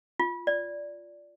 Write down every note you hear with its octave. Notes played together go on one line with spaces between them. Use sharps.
F4
D5